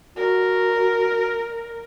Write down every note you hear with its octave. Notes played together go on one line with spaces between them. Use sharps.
F#4 A#4